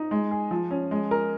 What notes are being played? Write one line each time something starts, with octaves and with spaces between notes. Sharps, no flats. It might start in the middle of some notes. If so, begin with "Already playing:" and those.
Already playing: D#4
G#3
G#4
F3
C#4
G#3
A#4